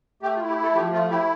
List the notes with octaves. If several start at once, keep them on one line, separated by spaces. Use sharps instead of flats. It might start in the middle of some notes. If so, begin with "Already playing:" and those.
A3 G4
F4
E4
G4
A3 A4
F3 G4
A3 F4
E4 G4